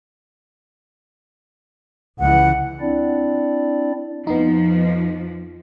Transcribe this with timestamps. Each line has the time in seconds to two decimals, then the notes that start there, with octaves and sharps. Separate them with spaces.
2.19 C#2 E3 F#5
2.80 C4 D4 E4 D5
4.27 F2 F3 B3 D#4